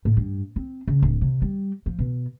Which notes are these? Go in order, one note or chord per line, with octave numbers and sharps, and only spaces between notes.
A2
G2
C4
C#3
D1
C3
G3
F3
B2